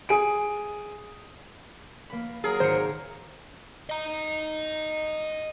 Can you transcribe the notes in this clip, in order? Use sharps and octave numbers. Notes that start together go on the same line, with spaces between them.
G#4 D7
A#3 B5
F#3 G#4 A#4
G#1 F4 C5 C#7
D#5 A#5